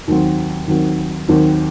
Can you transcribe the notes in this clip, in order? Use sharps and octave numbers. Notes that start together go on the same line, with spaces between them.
D#2 D#3 F#3 C4
D#2 D#3 F#3 C4
D#2 D#3 F#3 C4